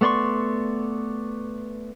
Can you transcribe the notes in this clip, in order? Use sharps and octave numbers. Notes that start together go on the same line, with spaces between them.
A3 B3 D5 C6 C#6